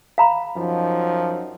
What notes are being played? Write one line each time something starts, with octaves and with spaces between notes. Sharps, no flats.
F5 A#5 B5
F#2 F3 D#4